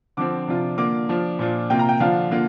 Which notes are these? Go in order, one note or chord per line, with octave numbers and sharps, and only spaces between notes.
D3 F3 C4 D6
C3 F3 D4 F4
D3 A#3 D4 F4 D6
F3 D4 F4
A#2 F3 D4 F4
C3 A#3 F4 G5
A#5
G5
D3 F3 D4 F4 F5
D3 A#3 F4